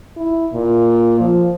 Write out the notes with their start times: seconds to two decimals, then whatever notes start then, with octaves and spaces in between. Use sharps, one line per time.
0.17 E4
0.53 A#2
1.21 F3